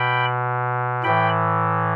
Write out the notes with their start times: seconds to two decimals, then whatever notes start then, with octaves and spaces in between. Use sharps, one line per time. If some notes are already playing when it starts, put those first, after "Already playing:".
Already playing: B2 G5 B5
1.04 A2 E3 G5 B5